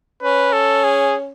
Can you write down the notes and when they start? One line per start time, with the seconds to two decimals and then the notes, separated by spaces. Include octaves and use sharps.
0.22 C#4 B4
0.53 A4
0.84 G#4